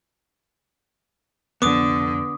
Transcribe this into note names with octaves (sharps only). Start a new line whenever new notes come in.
C2 F2 D3 F3 B3 D6 D#6